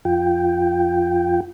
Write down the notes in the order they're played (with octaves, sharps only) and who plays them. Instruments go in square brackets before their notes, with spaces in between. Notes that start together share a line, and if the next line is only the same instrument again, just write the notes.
[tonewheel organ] F2 F4 G5